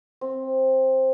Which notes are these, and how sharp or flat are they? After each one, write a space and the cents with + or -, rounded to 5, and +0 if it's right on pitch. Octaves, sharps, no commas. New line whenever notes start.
C4 +10